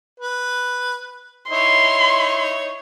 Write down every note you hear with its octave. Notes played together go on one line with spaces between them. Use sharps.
B4
D#4 E4 C#5 C6